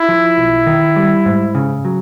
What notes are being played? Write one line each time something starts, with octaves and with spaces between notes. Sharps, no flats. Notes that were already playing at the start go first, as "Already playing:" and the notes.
Already playing: E4
F3
B1
D#3
G3
G#2
C#3
F#3